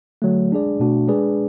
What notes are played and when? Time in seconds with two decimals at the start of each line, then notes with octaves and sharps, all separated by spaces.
0.22 D3 F#3 A3
0.51 G#3 D4 G#4 D5
0.80 B2 A3 D4 F#4
1.08 G#3 D4 G#4 B4 D5